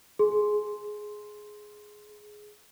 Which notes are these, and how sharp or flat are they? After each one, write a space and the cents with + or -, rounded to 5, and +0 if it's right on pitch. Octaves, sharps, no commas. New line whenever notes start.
G#4 +10 C6 +0